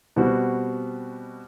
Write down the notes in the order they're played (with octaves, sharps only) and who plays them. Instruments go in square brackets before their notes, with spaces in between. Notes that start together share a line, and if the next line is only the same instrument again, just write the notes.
[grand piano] B2 G3 C4 F#4